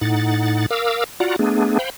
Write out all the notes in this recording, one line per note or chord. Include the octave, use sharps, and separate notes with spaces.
A2 D#4 F#5 A6
A#4 F5 D6 E6
F4 F#4 D5 F#5 A#5
A3 B3 D4 G#4
C5 F5 G5 B5